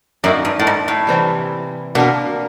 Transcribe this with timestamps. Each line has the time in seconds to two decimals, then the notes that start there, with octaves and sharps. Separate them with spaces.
0.24 F#2 A#3 D#4 F#4 A#4 D5
0.45 G2
0.59 A2
0.67 G#2
0.88 A2
1.07 C3 E3 G3 C4 E4
1.95 B2 A#3 D4 F4 A#4